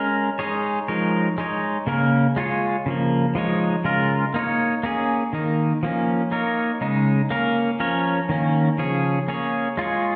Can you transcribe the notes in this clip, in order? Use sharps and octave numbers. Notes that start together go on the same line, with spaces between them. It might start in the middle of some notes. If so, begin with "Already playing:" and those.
Already playing: G#3 C#4 A#4
G#3 D#4 G#4 C#5
F3 G#3 D#4 A#4 C#5
G#3 D#4 C#5
C#3 A#3 C#4 A#4
G#3 F4 G#4 C#5
C#3 F3 A#3
F3 G#3 D#4 C#5
C#3 G#3 F4 A#4
A#3 D#4 C#5
A#3 C#4 G#4
D#3 A#3 D#4
F3 A#3 C#4
A#3 D#4 A#4 C#5
C#3 G#3 D#4
A#3 C#4 A#4
F3 C#4 A#4 C#5
D#3 A#3 C#4
C#3 F3 C#4 G#4 C#5
A#3 C#4 G#4 C#5
G#3 F4 G#4 C#5